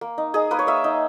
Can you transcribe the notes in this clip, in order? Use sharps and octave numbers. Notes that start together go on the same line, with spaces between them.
A#3
D#4
D#4 G#4
A#3 B4
C#5
A#3 E5
D#4